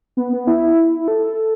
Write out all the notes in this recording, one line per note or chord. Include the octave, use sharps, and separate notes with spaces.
B3
B3
E4
A4